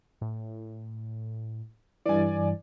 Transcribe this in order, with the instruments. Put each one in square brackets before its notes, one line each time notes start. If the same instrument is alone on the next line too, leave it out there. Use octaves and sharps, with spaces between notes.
[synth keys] A2
[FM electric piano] G2 E3 [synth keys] D5 G#5